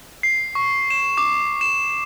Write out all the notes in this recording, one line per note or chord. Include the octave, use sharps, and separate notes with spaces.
C7
C#6
E7
D6
E7